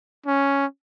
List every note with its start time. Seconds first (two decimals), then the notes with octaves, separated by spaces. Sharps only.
0.26 C#4